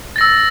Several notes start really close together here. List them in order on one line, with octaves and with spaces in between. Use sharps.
A6 A#6 E6